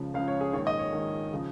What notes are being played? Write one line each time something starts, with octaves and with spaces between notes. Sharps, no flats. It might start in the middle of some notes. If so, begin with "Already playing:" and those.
Already playing: C#2 C#3 F3
C#2 C#3 F3 F5
C#5
G#4
A#1 G#2 D#3 C#5
D#5
C#5
A#1 G#2 D#3
C#3 F3